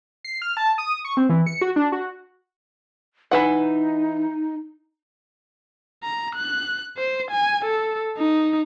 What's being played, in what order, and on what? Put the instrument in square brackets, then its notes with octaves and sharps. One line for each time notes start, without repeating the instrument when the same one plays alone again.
[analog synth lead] C7
F6
A5
D#6
C#6
C4
E3
C#7
F#4
D4
F#4
[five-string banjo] E3 B4 F#5 [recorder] D#4
[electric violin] A#5
F#6
C5
G#5
A4
D#4